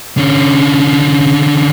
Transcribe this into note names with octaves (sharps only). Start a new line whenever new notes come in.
D3 C#4